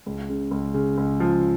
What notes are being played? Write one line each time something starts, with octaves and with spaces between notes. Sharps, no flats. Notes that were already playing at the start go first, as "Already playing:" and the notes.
C#2
C#3
C#2
C#3
C#2
F3